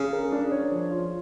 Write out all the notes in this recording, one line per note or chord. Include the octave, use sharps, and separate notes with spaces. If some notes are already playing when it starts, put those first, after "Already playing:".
Already playing: C#3
A#4
D4
C#5
F3
F4